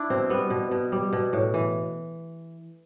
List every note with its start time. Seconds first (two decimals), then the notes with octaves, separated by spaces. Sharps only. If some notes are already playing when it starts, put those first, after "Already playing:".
Already playing: D4 E4
0.10 B2 C4
0.30 G3 B3
0.50 B2
0.71 B2
0.92 G3
1.13 B2
1.33 A2
1.54 E3